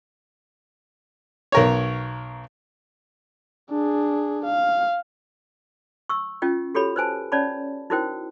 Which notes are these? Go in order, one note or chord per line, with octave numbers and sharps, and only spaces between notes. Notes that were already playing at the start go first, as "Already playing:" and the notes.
B1 A#4 C#5
D4 G#4
F5
C#6 E6
C#4 F4 D#5 G5
F#4 G4 A4 C#5 B5
B4 C5 G#5 A5
C#4 C#5 D5 A5 B5
D#4 E4 F#4 A#4 C5 G5